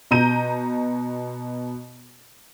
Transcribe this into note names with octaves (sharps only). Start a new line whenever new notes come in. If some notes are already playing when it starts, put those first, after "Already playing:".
B2 A#5 G6 D#7